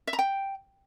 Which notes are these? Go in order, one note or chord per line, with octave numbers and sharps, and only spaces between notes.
E5
A#5
G5